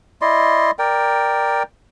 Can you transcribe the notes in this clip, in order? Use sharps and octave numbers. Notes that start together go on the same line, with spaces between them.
E4 D5 D#5 C6
A#4 D5 G5